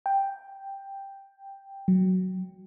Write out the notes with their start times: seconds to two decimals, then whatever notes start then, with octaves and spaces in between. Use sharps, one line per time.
0.06 G5
1.88 F#3